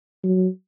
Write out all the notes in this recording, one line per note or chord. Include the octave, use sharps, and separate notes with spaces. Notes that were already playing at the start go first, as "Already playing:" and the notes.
F#3